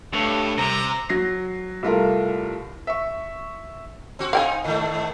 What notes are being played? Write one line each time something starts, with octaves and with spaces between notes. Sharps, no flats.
G2 A3 C#5
C2 C3 A#5
F#3 A#6 C7
C2 A3 F4 A#4
E5 C#6
C4 F#4
C4 D#4 F5 G5 G#5
G#2 D#3 A3